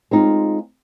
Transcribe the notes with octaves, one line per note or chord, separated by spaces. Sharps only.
G#3 C4 D#4 F4